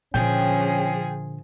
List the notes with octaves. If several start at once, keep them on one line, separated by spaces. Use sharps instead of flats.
A#2 D3 F3 C#4 G#4 G5